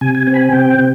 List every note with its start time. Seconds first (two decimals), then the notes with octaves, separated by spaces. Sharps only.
0.01 C3 G#5
0.15 G#5
0.27 C4 G#5
0.34 B5
0.41 G#5
0.53 C3 G5
0.79 C3